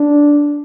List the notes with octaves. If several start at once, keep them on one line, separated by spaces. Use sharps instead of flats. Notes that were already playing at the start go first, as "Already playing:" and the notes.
Already playing: D4